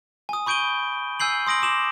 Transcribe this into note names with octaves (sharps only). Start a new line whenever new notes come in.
G#5 D#6
B5 C#6 G6 D7 D#7 G7
G#5 E6 G6 C7 F#7
C6 D#6 A#6 D7 F#7
D6 E7 F#7